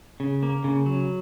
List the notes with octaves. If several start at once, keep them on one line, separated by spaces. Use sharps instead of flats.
C#3
A#3
C#3
F#3